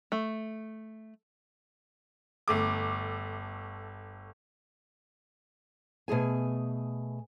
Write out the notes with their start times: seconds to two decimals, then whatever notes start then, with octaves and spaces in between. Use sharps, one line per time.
0.12 A3
2.48 G1 A3 D6
6.08 B2 A3 G#4 G#5